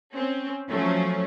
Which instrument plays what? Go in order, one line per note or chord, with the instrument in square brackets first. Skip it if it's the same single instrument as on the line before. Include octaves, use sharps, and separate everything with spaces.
[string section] C4 C#4
F3 F#3 A3 C#4